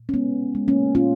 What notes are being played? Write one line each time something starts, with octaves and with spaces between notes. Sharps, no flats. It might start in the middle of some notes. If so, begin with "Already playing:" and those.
Already playing: A#2
C#4
G#3 B3
G#3
A#3 C#4
A#2 C#4 F4